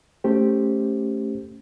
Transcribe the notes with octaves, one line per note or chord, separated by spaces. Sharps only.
A3 C#4 G4 C5